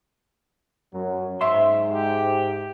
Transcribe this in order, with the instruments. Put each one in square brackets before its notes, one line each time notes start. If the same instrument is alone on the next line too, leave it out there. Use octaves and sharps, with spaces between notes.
[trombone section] F#2 F#3
[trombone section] G#2 [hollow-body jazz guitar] E5 C6
[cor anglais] G4